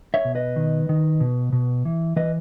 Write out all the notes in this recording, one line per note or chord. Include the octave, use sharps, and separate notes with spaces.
C#5 E5
B2
B4 D#5
D#3
D#3
B2
B2
E3
E3 B4 D#5